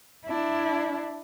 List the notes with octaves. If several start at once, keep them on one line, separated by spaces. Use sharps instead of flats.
D4 E4